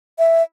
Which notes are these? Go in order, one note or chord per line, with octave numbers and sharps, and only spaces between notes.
E5